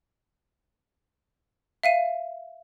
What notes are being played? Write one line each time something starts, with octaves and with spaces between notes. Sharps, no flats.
E5 F5 D#7